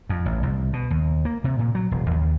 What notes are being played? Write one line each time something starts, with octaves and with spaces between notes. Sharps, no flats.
F2
A1
C2
B2
D#2
A#3
C3
A#2
F#3
E1
D#2